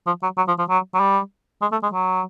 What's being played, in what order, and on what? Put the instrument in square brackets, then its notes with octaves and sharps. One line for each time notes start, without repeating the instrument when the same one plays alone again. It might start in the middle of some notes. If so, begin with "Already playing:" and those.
[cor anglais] F3
F#3
F#3
F3
F3
F#3
F#3
G3
G#3
A3
G#3
F#3